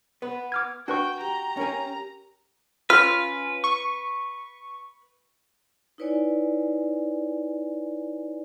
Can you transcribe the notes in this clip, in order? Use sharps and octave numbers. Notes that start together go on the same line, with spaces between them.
B3 B4
D6 F6 G#6
D4 F#4 B4 G5 C#6
G4 G5 A#5
C#4 A#4 G#5
C#4 F4 B4 F6
C#6
D#4 E4 B4 C#5 D5 G#5